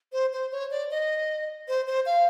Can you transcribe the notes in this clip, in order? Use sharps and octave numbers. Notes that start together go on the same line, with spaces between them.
C5
C5
C#5
D5
D#5
C5
C5
F5